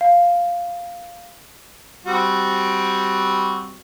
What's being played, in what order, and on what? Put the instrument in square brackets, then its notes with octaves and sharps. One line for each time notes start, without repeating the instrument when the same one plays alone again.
[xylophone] F5
[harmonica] G3 C4 F#4